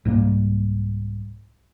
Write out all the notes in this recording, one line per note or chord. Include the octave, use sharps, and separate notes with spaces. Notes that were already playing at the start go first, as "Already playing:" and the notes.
C2 G#2 G3 A#3